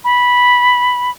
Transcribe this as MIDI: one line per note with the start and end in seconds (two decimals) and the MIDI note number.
0.04 1.10 83